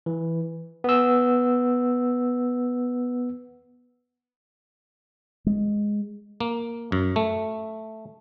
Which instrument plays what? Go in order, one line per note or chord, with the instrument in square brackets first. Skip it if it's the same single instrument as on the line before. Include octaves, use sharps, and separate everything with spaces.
[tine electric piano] E3
B3 E6
[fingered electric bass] G#3
[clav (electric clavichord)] A#3
F#2
A3